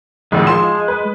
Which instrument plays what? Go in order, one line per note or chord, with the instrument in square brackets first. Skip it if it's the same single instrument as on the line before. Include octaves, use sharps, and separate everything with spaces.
[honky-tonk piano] G#1 F2 A2 [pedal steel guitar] G#3
[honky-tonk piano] F3 C6 E7
B4